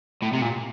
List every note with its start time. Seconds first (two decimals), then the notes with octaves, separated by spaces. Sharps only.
0.23 A2
0.33 C3
0.42 A#2